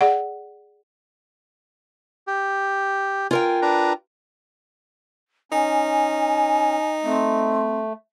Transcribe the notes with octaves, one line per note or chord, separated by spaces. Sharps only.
G#4 D5 F#5
G4
F4 A#4 G5 G#5
D4 B4 A#5
C#4 D#4 G#5
A3 C4